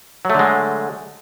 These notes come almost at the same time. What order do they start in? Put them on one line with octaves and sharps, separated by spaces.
F#3 A3 D3 G#3